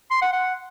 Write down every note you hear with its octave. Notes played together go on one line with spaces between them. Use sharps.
C6
F#5
F#5